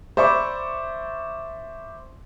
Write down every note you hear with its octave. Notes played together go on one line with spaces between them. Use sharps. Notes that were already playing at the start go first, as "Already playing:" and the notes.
C5 D5 E5 B5 C#6 D6